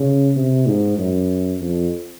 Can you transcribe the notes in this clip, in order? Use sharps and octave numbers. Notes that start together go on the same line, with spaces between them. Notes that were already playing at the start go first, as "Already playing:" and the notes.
Already playing: C#3
C3
G#2
F#2
F2